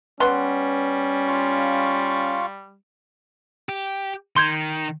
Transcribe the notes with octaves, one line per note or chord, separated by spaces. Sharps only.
G3 B3 C#4 C6
F4 F5 C#6
G4
D#3 C6 G6 G#6